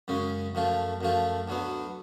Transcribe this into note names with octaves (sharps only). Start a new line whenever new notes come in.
F#2 C#3 G#3 C#4
F#2 F3 A3 F4
F#2 F3 A3 F4
D2 D3 F#3 B3